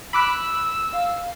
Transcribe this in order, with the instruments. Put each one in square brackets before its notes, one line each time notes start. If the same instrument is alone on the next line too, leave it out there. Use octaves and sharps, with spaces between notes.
[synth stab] B5 D6 F#6 [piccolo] E6
[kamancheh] F5